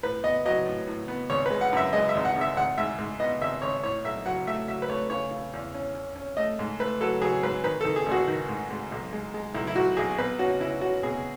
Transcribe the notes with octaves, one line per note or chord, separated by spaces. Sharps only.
A2 B4
B3 D#5
F#3 D#5
A2
A2
B3
G#1 C#5
B4
G#3
F#5
F#2 E5
G#3 D#5
E5
G#1
F#5
G#1
E5
G#1 F#5
G#2 E5
G#2
B3 D#5
G#1 E5
G#1 C#5
A2 C#5
B1 E5
F#3 F#5
A3 E5
F#3 E5
B4
A3 C#5
C#3 C#5
C#3
E2
C#4
C#4
C#4
A3 D#5
G#2
A3 B4
F#3 A4
F#3 G#4
G#2 B4
D#3 B4
A4
D#3
G#4
G#1
F#4
D#3
G#2
G#2
B1
G#3
G#3
B1 E4
E4
B1 F#4
B1 G#4
B2 B4
C#4 F#4
C#4 E4
C#4 F#4
B2 G#4